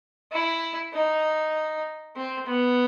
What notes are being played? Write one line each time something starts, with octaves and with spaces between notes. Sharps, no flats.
E4
D#4
C4
B3